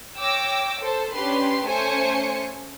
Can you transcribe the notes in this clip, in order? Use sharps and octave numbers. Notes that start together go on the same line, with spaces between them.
C#5 G5 D6 E6 A#6
A4 C5
C#4 D4 G4 B4 C6
A3 C#4 C5 G#5 C#7